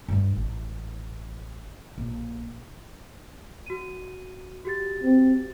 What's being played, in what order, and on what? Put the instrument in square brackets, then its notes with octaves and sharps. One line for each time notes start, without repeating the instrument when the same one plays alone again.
[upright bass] G2 G3
A1
A#1
[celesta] F#4 D#7
F#4 G4 A6
[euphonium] C4